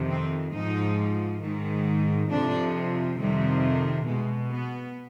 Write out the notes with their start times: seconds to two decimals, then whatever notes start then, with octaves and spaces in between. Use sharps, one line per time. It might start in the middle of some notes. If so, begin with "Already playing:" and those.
Already playing: F2 C3 D#3
0.10 C4
0.53 G#2 F3 D#4
1.41 G#2 D#3
2.29 F2 C3 F3 D4
3.17 F2 C3 D#3 G3
4.06 B2 G#3
4.50 B3